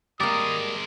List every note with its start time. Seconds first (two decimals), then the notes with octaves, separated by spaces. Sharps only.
0.20 G3 G#3 A#3 A#4 D6 D#6 A6